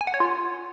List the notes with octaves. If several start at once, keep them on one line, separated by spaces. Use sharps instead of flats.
G#5
F#5
C#5
F4